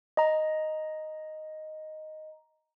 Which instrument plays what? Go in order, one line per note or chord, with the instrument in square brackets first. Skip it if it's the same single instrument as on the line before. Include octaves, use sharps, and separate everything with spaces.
[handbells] D#5 A#5